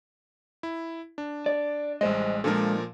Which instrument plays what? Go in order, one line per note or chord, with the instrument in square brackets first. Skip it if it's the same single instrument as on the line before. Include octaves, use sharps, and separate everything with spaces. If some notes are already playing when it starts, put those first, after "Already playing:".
[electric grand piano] E4
D4
[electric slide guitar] D5
[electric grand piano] A1 G#3 [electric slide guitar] G3 C5 D#5
[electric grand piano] A#2 F3 A#4 [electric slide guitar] G#3 D4 A4